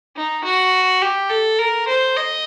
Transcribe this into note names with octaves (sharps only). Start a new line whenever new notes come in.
D#4
F#4
G4
A4
A#4
C5
D#5